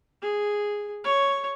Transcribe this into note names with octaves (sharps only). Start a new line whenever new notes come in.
G#4
C#5